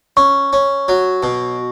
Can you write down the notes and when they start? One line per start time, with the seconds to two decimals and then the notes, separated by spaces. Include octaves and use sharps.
0.17 C#4 C#6
0.53 C#4
0.88 F#3
1.23 B2